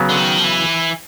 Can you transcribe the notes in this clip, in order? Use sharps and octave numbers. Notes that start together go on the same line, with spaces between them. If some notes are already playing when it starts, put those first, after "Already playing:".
Already playing: C#3 F#3 B3
D3
D#3
F3
E3